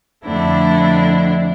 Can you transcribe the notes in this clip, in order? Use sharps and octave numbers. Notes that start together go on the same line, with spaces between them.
F2 D3 A3 D4 E4